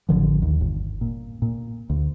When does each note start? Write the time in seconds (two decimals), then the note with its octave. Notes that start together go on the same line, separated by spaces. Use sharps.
0.09 A1 D3 F3
0.42 D#2
0.61 G1
1.01 A#2
1.42 A#2
1.90 D2